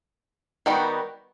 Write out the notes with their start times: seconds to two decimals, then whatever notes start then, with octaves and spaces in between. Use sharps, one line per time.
0.66 D#3 G3 B3 D#4 F#4